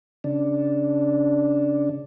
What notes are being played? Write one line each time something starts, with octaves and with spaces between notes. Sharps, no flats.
C#3 D4